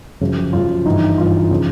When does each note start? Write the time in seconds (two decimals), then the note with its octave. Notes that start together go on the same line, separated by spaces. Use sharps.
0.21 F#2 C#3 F3
0.53 F#2 C#3 F3 F4
0.86 G2 E3 D#4
1.18 G2 E3 F4
1.51 C#3 F3